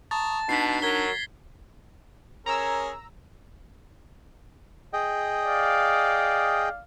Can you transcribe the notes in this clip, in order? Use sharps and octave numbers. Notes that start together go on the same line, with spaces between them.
A5 A#5 C#6 D#6 A6
B2 D4 D#4 B6 C7
F#3 A#4 G#6 B6 G7
C#4 G#4 A#4 A#5 E6
G#4 D#5 G5
D5 F5